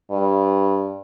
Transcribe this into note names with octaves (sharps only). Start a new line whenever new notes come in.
G2